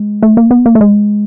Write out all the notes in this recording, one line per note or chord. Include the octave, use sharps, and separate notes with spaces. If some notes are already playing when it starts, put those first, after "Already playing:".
Already playing: G#3
A3
A#3
B3
A#3
A3
G#3